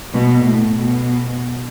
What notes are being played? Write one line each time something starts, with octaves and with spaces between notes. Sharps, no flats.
B2
A2
B2